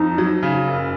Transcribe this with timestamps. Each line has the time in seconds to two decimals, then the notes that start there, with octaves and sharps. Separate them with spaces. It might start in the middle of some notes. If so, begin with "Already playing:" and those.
Already playing: F2 D#4
0.18 F#3
0.43 C#3
0.67 F#1